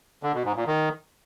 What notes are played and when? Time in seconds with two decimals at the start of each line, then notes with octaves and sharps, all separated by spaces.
0.23 D3
0.34 B2
0.45 G#2
0.56 A#2
0.67 D#3